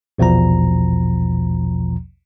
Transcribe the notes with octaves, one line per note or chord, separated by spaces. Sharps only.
A#1 E2 B2 F3 A#5